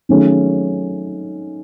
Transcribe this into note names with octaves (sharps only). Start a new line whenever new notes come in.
D#3 F#3 A3 C#4 G#4